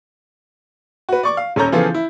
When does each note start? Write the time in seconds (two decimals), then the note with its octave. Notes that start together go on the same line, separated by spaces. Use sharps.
1.09 F#4 B4
1.23 D5 C#6 D6
1.37 F5
1.56 D#1 C#4 A4 C#5 A#5 G6
1.72 C#3 E3 F3 B3 F4 A4
1.94 E4